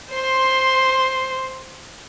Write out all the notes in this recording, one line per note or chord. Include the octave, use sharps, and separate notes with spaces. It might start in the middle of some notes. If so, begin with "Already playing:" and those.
C5 C6